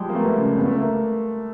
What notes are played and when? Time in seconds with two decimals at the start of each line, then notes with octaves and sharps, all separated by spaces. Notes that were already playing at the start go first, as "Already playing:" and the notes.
Already playing: F3 G3 G#3
0.09 A#3
0.15 A3 B3
0.37 C#3
0.58 C#2 B3
0.65 A3
0.73 A#3